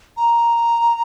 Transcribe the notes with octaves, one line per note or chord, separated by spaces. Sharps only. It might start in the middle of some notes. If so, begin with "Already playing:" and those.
A#5